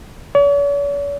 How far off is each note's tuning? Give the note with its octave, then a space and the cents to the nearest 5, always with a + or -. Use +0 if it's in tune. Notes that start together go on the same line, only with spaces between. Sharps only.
C#5 +45